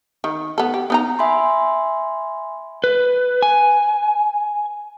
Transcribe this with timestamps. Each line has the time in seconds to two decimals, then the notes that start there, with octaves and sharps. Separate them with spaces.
0.24 D#3
0.58 B3 A4
0.74 G4
0.90 B3 D#4 A#5
1.19 E5 G#5 B5 C6
2.84 B4
3.43 G#5